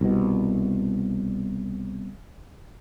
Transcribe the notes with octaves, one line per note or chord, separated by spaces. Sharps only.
C2 B2